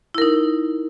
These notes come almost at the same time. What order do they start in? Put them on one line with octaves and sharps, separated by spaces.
E4 A#4 D#4